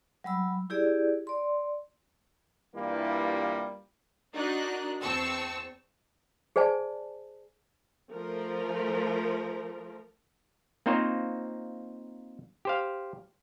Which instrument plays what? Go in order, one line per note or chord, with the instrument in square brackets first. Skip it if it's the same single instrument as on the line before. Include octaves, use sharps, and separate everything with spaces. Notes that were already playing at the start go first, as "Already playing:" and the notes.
[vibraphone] F#3 G3 B5 E6
E4 G4 G#4 D5
D5 C6
[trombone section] G2 E3 G3 A#3 E4 F4
[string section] D4 D#4 F#4 A#4 F#6
E2 C4 A5 C#6 E6
[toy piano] G#4 C5 D5 G#5 A5
[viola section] F3 A3 A#4
[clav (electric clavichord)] A#3 C4 D#4 F4 C5 C#5
G4 C5 F5